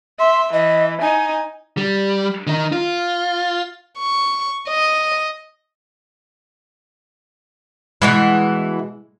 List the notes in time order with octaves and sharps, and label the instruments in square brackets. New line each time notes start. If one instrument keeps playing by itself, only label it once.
[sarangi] E5 [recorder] C6
[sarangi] E3 [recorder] D#5
[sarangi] D#4 [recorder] G#5
[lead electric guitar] G3
D#3 D#4
F4
[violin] C#6
D#5
[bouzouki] B2 E3 E4 [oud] G#3